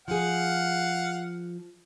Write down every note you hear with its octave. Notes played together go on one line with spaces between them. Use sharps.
F3 G#4 F5 F#5